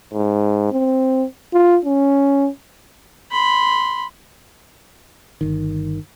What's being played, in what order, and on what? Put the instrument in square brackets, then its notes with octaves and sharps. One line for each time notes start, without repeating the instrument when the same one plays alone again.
[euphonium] G#2
C4
F4
C#4
[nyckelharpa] B5 C6
[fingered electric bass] G1 C2 D#3